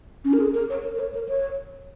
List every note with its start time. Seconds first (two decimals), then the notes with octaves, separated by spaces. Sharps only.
0.25 C#4
0.33 A#4
0.40 G#4
0.54 A#4
0.70 C#5
0.84 A#4
0.95 A#4
0.99 C#5
1.14 A#4
1.29 C#5